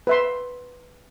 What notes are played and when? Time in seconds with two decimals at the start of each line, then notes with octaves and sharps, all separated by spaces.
0.07 B4 E5 C6